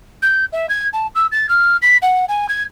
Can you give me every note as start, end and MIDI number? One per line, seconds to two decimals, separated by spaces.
0.22 0.45 91
0.52 0.66 76
0.69 0.88 92
0.93 1.07 81
1.15 1.27 88
1.32 1.47 93
1.49 1.77 89
1.82 1.97 95
2.02 2.25 78
2.29 2.46 80
2.49 2.63 92